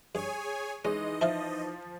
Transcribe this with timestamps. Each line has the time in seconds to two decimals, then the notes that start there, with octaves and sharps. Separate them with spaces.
0.15 G2 G#4 C#5 G#5
0.85 E3 G#3 C#4 D#4 D#5
1.21 F3 E4 C5 F5